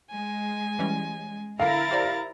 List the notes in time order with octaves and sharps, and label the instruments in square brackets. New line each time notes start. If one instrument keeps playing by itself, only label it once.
[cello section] G#3 [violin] G#5
[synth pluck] E3 G3 C#4
[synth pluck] D3 [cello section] E4 A#4 [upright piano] F5 [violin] A#5 A6
[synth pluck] G4 C5 D5